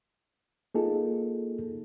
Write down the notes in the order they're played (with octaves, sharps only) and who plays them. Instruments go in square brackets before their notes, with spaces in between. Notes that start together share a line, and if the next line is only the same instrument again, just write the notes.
[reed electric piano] A#3 D#4 F4 G#4 A4